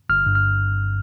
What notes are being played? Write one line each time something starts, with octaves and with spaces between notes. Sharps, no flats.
G1 F6
G2
F6